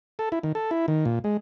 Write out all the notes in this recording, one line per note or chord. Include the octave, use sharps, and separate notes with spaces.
A4
E4
D#3
A4
E4
D#3
A#2
G#3